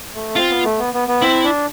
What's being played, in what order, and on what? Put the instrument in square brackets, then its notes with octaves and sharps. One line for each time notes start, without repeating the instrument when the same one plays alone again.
[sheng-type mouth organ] A3
[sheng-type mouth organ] C4 [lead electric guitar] F4
[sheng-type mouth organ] B3
A3
B3
B3
B3
[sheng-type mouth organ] C4 [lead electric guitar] E4
[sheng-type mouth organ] D4